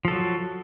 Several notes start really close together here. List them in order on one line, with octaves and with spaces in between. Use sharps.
F3 A4 F#3